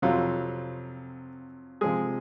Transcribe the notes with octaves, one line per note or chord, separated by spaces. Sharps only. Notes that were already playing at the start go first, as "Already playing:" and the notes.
F2 C3 F#3 F4
C3 F3 G#3 G#4